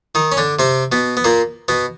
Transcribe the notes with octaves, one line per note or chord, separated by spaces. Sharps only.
D#3 D#4
C#4
D3 D4
C3 C4
B2 B3
B3
A#2 A#3
B2 B3